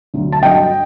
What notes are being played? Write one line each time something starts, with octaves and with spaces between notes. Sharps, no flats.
D2 D3 F#3
A5
G2 F#3 D#5 G5